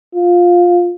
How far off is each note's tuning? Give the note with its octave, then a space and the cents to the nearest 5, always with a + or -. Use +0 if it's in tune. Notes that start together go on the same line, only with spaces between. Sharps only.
F4 +10